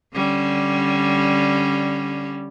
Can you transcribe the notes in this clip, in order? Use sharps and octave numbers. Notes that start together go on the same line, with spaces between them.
D3 G3 C#4